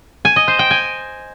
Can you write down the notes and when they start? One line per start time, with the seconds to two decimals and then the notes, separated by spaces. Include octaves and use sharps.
0.25 G#5
0.36 D#5
0.48 C5
0.59 G5
0.71 G#5